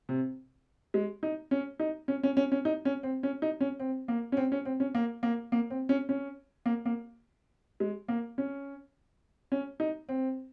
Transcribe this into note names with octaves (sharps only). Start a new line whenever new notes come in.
C3
G#3
D#4
C#4
D#4
C#4
C#4
C#4
C#4
D#4
C#4
C4
C#4
D#4
C#4
C4
A#3
C#4
C4
C#4
C4
C#4
A#3
A#3
A#3
C4
C#4
C#4
A#3
A#3
G#3
A#3
C#4
C#4
D#4
C4